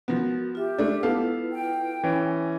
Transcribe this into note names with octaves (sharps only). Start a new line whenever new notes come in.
F3 B3 F#4 A#4
F4 G4 E5
A3 D4
B3 E4 F4 A4 B4 F5
G5
E3 C#4